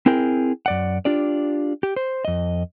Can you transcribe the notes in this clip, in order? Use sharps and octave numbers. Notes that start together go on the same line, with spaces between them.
C4 E4 G#4 A#4 G5
F#2 D5 F#5
D4 F4 G4 D5
G4
C5
F2 D#5